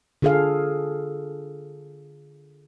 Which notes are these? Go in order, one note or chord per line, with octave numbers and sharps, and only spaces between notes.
D3 F4 G#4 A4 F5